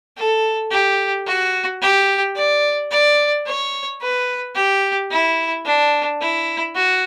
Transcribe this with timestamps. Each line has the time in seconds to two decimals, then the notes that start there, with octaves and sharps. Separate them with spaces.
0.17 A4
0.71 G4
1.26 F#4
1.82 G4
2.36 D5
2.91 D5
3.46 C#5
4.01 B4
4.55 G4
5.11 E4
5.65 D4
6.21 E4
6.75 F#4